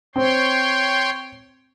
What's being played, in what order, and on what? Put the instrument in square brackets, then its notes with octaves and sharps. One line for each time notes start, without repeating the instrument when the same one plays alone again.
[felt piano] C4 [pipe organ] C#5 G5 C6